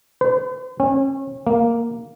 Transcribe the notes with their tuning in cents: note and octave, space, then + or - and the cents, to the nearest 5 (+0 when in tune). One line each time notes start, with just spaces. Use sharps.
C5 -45
C#4 -35
A#3 +0